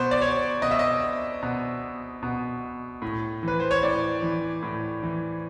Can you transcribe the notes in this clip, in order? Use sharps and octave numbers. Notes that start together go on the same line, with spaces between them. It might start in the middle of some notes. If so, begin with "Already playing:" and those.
Already playing: B2 C5
D5
C#5
B2 D#5
E5
D#5
B2
B2
A2
E3 B4
C5
C#5
A2 D5
E3
A2
E3